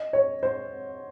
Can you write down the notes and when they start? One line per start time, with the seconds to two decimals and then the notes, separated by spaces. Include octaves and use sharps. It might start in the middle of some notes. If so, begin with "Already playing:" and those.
Already playing: D#5
0.13 C#5
0.43 C5